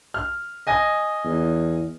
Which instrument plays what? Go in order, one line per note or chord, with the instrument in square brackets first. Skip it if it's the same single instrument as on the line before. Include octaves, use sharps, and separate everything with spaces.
[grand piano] F6
D#5 G#5 A#6
[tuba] E2